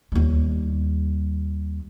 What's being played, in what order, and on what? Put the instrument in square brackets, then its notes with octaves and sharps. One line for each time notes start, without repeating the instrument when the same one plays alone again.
[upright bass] D#2 G3